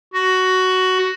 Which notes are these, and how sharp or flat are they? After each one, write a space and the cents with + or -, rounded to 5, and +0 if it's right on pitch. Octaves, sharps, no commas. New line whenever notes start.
F#4 +10